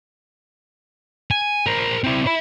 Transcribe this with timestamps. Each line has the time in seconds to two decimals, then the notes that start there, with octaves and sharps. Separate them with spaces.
1.31 G#5
1.67 A#4 C5
2.04 C4 E4
2.27 E5 B5